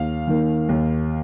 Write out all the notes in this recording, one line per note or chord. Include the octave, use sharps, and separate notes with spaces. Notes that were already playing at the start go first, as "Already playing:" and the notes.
Already playing: D#2 F5
D#3 A#3
D#2